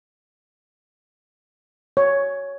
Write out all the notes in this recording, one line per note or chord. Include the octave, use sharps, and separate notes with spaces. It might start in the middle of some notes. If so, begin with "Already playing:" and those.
C#5